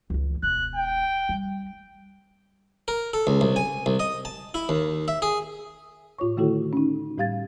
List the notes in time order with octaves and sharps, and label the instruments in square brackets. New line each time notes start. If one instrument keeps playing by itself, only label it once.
[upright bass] C#2 E3
[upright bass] E1 [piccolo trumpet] F#6
[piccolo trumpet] G5
[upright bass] G3
[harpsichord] A#4
A4
C#2
C2
G#5
C2
D#5
A5
E4
D#2
E5
G#4
[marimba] A2 F4 C#5 C#6
D3 D#3 A3 E4 F#4 A4
C#4 D#4
A2 G3 G4 F5 G#6 A6